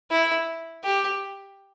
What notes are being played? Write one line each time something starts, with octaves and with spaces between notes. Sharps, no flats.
E4
G4